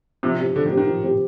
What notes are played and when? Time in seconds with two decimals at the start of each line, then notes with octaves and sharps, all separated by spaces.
0.23 C3 F3
0.39 C4 G4
0.55 D3 F3
0.66 D#3
0.71 C4 G4
0.77 D#3
0.87 F3
1.04 C4 G4